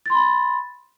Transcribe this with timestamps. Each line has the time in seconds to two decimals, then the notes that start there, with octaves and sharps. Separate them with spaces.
0.06 A6
0.10 C6
0.14 B5